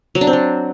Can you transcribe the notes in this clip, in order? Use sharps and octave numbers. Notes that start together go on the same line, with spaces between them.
F#3
D4
C4
F#3